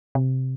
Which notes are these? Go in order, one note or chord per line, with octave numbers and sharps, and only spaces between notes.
C3